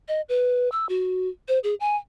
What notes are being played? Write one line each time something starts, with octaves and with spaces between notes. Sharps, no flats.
D#5
B4
E6
F#4
C5
G#4
G#5